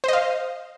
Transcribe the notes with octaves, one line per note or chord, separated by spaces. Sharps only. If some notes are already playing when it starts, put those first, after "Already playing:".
C5 D#5 F5